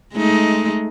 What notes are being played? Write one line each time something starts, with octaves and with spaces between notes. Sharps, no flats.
G#3 A3 D#4